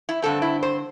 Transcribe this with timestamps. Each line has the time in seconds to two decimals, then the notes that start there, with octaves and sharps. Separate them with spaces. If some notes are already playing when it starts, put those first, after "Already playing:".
0.09 E4
0.22 G2 D3 C4 A4
0.42 E4
0.63 C5